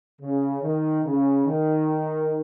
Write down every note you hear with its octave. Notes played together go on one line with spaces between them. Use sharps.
C#3
D#3
C#3
D#3